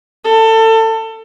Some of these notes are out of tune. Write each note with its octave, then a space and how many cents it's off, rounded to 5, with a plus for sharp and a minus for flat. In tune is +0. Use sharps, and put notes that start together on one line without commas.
A4 +25